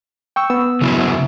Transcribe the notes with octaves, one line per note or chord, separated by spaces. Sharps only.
G5 C#6 E6
B3 E6
C#3 F#3 E4